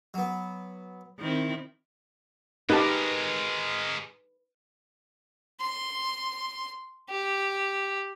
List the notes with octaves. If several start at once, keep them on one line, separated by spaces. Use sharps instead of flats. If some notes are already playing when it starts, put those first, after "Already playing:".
F#3 B3
D#3 C4 E4
G#3 D#4 G4 A#4 B4 A5
C6
G4